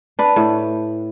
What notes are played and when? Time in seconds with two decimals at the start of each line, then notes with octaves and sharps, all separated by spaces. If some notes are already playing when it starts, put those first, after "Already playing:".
0.19 D4 B4
0.36 A2